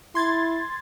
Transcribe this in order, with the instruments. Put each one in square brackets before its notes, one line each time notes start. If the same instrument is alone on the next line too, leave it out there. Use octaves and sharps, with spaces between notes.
[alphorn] E4 [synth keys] C6 G#6 A6